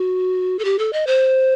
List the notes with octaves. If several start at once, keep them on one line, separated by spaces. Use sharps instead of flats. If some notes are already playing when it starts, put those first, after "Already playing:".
Already playing: F#4
A4
G4
A4
D#5
C5